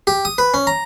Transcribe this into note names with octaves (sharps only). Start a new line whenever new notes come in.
G4
D#6
B4
C#4
A#5